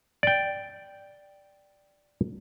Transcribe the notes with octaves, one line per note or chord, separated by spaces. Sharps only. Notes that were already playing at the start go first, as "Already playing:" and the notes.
D5 G5